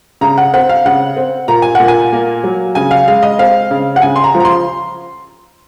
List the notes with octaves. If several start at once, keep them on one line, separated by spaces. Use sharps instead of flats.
C#3 A#5
F#5
C4 F#5
F5
C#3 F#5
C4
A#2 A#5
G#5
A#2 F#5
G#5
A#3
F#3
C#3 G#5
F5
G#3 F5
D#5
C4 F5
C#3
F#5
C#3 G#5
C6
A#5
F3
A#5
C6